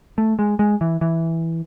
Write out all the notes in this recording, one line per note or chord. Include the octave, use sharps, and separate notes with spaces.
A3
G#3
G#3
E3
E3